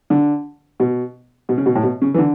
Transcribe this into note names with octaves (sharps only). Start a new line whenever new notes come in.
D3
B2
B2
C#3
B2
A2
B2
C#3
E3
D3